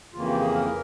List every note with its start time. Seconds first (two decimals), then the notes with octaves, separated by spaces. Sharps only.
0.14 F2 C#3 E3 A#3 F4
0.28 G4
0.41 G#4
0.55 A#4